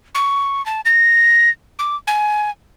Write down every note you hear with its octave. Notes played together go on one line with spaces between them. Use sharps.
C#6
A5
A#6
D6
G#5